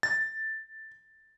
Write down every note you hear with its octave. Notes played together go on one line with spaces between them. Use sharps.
A6